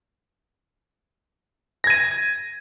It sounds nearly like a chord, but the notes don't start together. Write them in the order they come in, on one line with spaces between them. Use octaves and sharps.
A#6 G#6 D#7